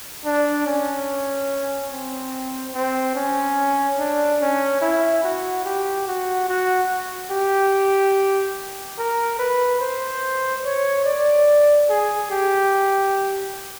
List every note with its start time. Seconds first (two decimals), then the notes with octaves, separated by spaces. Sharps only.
0.25 D4
0.67 C#4
1.91 C4
2.74 C4
3.15 C#4
3.98 D4
4.41 C#4
4.81 E4
5.24 F#4
5.65 G4
6.07 F#4
6.48 F#4
7.31 G4
8.98 A#4
9.39 B4
9.81 C5
10.65 C#5
11.05 D5
11.89 G#4
12.31 G4